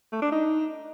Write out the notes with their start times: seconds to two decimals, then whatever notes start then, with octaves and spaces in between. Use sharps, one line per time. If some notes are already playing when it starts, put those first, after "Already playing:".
0.13 A3
0.22 D4
0.32 D#4